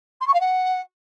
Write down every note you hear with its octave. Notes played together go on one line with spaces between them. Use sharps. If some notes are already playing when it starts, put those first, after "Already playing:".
C6
C#6
F5
F#5